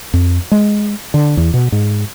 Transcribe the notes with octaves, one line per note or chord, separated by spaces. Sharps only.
F2
G#3
D3
E2
B2
G#2